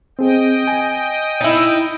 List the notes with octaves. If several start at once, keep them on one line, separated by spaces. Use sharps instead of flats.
C4 G#4 D#5 G5
G#5
D#4 E4